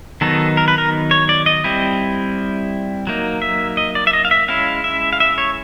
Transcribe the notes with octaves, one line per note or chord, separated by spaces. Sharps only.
D#3 F#3 B3 D#4 A4
A#4
B4
A#4
C#5
D5
D#5
G3 C4 E4
F#3 A#3 D#4
E5
D#5
D5
E5
D#5
F5
E5
G#3 C#4 E4 F5
E5
F5
E5
C#5